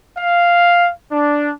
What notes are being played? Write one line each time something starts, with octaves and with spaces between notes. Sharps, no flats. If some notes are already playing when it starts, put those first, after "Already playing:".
F5
D4